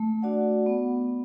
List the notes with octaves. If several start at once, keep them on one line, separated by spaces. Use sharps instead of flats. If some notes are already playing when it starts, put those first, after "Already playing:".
Already playing: A3
D4 F#4 D5 F#5
B3